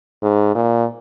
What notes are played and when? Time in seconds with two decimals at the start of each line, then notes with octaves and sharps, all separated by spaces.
0.23 G#2
0.55 A#2